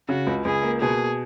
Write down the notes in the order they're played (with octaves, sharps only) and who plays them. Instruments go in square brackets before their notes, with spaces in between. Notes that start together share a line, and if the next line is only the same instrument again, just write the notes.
[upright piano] C#3 [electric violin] F#4
[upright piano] C#2
[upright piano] C#2 [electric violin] G#4
[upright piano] A#3
[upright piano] B2 [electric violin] G#4